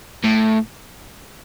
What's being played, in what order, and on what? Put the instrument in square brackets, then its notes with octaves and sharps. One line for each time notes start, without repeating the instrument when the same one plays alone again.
[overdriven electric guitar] A2